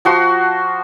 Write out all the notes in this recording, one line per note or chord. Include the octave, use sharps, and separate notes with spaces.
F3 F#4 C6